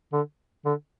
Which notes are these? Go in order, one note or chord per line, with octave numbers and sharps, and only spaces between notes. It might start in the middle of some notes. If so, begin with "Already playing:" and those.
D3
D3